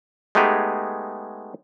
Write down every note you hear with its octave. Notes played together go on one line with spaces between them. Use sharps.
G#3 A3 B3 D#4 G4 G#4